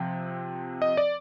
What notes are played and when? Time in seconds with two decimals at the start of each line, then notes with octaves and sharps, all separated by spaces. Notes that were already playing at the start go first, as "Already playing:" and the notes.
Already playing: C3 F3 C4 G5
0.82 D#5
0.97 D5